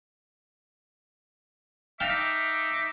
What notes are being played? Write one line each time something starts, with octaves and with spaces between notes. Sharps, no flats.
D#4 E5 F5 G5 A5 D6